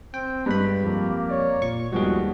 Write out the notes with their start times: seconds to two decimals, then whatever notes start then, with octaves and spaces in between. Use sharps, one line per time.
0.14 C4 G5
0.46 G2 G#3 G4 B4 B5
0.84 F2 A#3
1.29 C#5 D5
1.62 A#2 C#6
1.92 D#2 D#3 F3 G3 G#3 B3 F#4 G#4